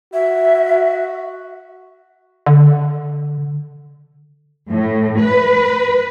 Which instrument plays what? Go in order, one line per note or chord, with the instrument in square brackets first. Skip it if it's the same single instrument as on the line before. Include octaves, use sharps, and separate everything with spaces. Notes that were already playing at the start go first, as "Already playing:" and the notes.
[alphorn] F#4 [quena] E5
[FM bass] D3
[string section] A2
B4